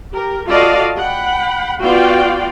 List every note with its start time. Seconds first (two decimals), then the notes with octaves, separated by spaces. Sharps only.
0.11 G4 A#4
0.48 F4 F#4 A4 D5 D#5 F5
0.96 F#5 G5 B5
1.80 B3 F4 F#4 D5 F5 G5